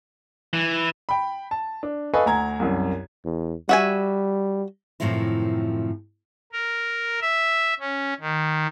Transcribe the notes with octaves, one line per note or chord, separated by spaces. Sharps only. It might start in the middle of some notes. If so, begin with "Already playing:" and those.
E3
G5 B5
A5
D4
A4 B4 D#5 F5 G#5 C#6
D2 G#5 A#5 G#6
C2 F#2
E2
G3 F#4 E5 G#5
F#2 A2 C3 D#3 F3 E4
A#4
E5
C#4
D#3